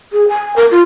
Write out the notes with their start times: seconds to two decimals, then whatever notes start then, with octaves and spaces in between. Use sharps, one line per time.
0.12 G#4
0.29 G#5
0.56 A#4
0.71 F4